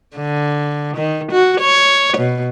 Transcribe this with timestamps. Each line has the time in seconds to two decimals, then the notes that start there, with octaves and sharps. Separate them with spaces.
0.16 D3
0.96 D#3
1.31 F#4
1.60 C#5
2.17 B2